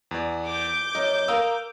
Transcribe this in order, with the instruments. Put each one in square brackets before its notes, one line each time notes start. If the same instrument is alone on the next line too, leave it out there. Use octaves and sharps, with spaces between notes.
[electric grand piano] E2 D5
[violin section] D6 G6
[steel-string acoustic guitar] F#2 [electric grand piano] D#5
[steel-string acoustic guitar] A#4 F5 [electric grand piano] A#5 D#6 E6